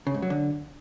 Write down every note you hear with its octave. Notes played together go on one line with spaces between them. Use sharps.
C#3
G#2
F#3
D3